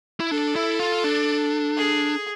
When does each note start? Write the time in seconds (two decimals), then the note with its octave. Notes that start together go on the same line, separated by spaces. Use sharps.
0.20 E4
0.31 D4 A4
0.56 E4
0.80 F4
1.04 D4
1.77 G#4